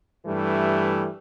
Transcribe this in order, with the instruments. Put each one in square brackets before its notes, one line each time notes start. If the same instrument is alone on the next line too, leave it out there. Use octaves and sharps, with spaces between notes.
[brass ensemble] G2 E3 G3 A3